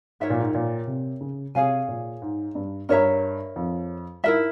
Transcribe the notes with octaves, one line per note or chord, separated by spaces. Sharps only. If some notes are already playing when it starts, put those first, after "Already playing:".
G#2 A#4 C#5 E5 G5
A#2
G#2
A#2
C3
C#3
C3 G#4 C#5 F5 G#5
A#2
G#2
G2
G2 A#4 C#5 E5 A#5
F2
G#2 E4 A#4 E5